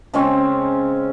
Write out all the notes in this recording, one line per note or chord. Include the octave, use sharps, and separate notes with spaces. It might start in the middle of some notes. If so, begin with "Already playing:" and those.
C#3 G#3 C4 C#4